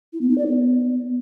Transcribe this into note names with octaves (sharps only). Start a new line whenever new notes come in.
E4
B3
D#4
D5
B3